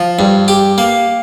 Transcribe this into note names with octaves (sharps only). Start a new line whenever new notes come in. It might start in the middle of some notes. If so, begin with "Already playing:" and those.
Already playing: F3
G2
G4
A#3